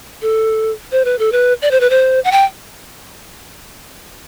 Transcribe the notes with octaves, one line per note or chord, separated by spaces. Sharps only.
A4
C5
B4
A4
B4
D5
C5
B4
C5
F#5
G5